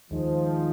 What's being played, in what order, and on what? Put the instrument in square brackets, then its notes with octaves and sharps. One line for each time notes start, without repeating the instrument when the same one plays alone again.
[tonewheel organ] D#2 D#3 G#3 D#4 [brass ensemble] F3